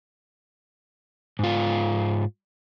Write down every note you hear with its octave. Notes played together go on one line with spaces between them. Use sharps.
G#2 F4